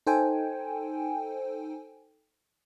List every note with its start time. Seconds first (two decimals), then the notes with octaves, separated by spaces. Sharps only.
0.06 D#4 A4 C5 G5 G#5